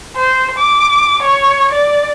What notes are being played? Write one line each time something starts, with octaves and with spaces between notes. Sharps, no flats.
C5
D6
C#5
D5